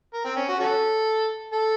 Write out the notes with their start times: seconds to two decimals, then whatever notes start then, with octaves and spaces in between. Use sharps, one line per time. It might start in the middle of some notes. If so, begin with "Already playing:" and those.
0.14 A#4
0.25 C4
0.36 C#4
0.49 F#4
0.60 C#4 F#4 A4
1.53 A4